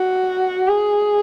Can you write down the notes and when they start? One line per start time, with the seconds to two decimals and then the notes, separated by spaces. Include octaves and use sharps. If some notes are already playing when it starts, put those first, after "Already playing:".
Already playing: F#4
0.68 G#4